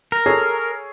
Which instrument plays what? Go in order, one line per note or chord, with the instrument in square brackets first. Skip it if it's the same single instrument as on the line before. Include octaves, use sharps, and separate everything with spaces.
[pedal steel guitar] A#4
[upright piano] G#4 A4 C#5